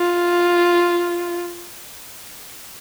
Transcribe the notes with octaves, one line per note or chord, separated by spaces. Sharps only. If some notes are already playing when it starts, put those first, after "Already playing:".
Already playing: F4